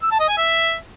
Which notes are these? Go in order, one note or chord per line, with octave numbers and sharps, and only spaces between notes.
E6
A5
D#5
G#5
E5